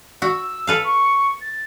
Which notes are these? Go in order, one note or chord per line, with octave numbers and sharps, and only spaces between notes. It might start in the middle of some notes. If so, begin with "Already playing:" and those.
F#4 E6
A4 B4 F5
C#6
A6